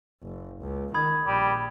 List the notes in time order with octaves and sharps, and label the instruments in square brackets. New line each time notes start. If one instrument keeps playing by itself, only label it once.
[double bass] F#1
C#2
[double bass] D#3 [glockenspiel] B5 D#6 G#6
[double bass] A#1 [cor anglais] G3